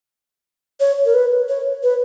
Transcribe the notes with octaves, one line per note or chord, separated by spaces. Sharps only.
C#5
A#4
B4
C#5
B4